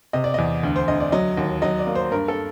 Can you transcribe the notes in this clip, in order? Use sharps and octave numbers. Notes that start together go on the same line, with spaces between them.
C3 D#5
D5
E2 D#5
D2
C5
D2 D#5
D5
F#3 D#5
D#2
F#3 D#5
D5
A#3
C5
G2 A#4
A4